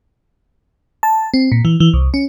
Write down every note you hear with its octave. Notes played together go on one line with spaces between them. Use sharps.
A5
C4
A#2
E3
E3
C2
C#4